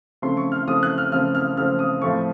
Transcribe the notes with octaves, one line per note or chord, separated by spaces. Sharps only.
C#3 F3 A3 C4 C6
C#6
F6
C#3 F3 A3 C4 D#6
F#6
F6
C#3 F3 A3 C4 F6
F6
C#3 F3 A3 C4 F6
D#6
A2 F3 A3 C4 C#6